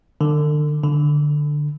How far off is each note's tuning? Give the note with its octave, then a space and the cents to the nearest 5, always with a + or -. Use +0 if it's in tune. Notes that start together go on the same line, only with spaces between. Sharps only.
D3 +40
D3 +10